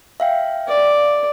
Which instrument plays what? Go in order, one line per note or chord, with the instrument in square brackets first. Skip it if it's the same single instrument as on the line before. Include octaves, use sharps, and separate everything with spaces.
[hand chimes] E5 F5 G5
[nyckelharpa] D5